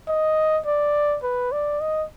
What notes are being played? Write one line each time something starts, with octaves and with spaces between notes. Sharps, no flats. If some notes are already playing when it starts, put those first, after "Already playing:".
D#5
D5
B4
D5
D#5